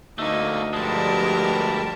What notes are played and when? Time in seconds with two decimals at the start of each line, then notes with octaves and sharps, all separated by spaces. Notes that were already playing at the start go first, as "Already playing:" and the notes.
0.19 D2 A3 A#3 D#4
0.73 G2 F3 G3 G#3 G4 A#4 A5